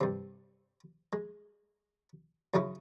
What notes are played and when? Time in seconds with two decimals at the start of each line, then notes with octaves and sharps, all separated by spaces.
0.01 G2 C3
1.13 G#3
2.54 F#2 C#3 D#4 E4